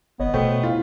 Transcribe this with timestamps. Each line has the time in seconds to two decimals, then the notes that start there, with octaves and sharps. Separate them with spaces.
0.20 G1 B3 C#5 D#5
0.34 B2 A3 C5 D#5 G5
0.63 E4 F4